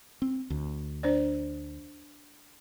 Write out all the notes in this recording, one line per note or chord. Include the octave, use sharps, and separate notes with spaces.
C4
D2
D4 C5 D5